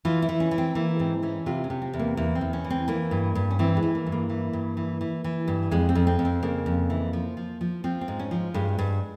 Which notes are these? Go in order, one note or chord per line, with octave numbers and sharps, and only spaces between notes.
E3 F4
E4
E3
C#4
E3
C4
E3 A#3
G#2 C4
E3 C#4
C3 F4
C#4
C3
C4
E2
A#3
E2 A#3
C4
E2
C#4
E3
C4
E3 A#3
G2
G2
C#4
E3 C4
G#3
E3
A#3
G2
A#3
E3
G2
E3
E3
E3
G2
F2 G#3
C4
F2
C4
F2
C4
C#3 A#3
F2
E3
F3
F3
F3
F3 C4
C4
G#2
C#4
F3
G2 G#3
G2